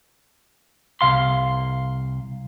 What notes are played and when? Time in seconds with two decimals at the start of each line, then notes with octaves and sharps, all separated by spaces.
1.01 C2 F5 C6